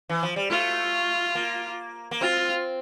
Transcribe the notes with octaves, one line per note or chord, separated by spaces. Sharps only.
E3
F3
G3
A3 F4
A#3
A#3
C4 F4